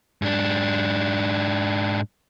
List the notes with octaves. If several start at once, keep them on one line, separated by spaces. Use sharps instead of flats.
G#2 D4